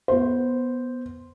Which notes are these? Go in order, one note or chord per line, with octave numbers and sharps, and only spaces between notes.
B3 C5